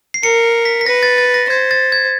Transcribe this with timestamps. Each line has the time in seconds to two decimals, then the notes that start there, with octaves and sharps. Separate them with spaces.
0.14 C7
0.23 A#4 C#7
0.65 B6
0.81 B6
0.86 B4 A#6
1.03 A6
1.18 A6
1.34 A#6
1.49 C5 G#6
1.71 A6
1.92 G#6